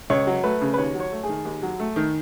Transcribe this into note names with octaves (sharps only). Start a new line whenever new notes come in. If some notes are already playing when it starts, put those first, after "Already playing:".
C#2 C#5
F#3
A3 B4
C#3
B4
D#2 C#5
F#3
C#5
A3
G#4
D#3
D#2
F#3
A3
D#3